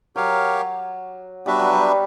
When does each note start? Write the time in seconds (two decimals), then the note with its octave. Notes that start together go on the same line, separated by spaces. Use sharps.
0.16 F#3 G4 A#4 C#5 F5
1.46 G3 B3 D4 F#4 B4 E5
1.60 F#3
1.73 G3